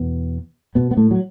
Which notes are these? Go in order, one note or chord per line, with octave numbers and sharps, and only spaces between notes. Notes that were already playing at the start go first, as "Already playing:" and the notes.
Already playing: E2 B2 B3
B2 B3
B3
A2 A3
F#3